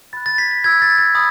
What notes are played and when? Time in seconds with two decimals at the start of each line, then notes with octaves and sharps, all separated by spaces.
0.13 B5 F#6 A6
0.26 A6
0.38 G#6 B6
0.51 A6
0.64 B5 E6 G#6
0.82 A6
0.98 A6
1.15 B5 D#6